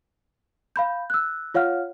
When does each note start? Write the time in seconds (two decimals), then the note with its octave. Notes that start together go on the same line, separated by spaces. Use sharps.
0.76 F5 B5 G6
1.10 E6 F#6
1.54 F4 C#5 F5 F#5 F6